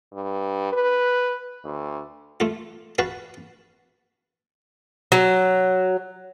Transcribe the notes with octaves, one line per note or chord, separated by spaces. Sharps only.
G2
B4
D2
A3 F4
F#4 B4 F5 A5
F#3